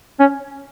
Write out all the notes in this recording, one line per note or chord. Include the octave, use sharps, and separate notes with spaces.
C#4